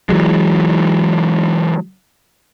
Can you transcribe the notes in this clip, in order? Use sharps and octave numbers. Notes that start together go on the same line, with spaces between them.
E3 F#3 G#3